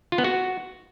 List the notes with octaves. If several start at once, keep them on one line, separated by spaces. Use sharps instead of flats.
F4
B3
F#4